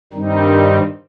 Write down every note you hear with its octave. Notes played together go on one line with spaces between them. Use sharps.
G2 D#3 G3 C4 D#4